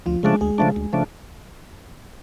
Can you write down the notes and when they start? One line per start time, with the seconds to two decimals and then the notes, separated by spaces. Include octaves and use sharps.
0.06 D2 F3 F4
0.23 C#3 F3 G#3 A3 D4 G#4
0.41 D2 G#3 G#4
0.58 C#3 F3 A3 D4
0.76 D2
0.93 C#3 F3 A3 D4